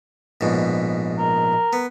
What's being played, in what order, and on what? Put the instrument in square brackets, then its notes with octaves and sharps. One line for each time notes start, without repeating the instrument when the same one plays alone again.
[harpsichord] A#1 G#2 B2
[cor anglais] A#4
[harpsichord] B3